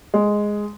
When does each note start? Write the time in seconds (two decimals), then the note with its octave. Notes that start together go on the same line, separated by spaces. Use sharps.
0.14 G#3